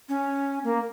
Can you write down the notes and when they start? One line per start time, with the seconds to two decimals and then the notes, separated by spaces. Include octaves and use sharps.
0.09 C#4
0.64 A#3